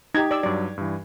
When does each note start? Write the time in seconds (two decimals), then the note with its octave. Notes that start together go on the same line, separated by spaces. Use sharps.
0.15 D#4 G4 G#6
0.31 D5 E6
0.43 G2 F#3 D5
0.78 G2 E3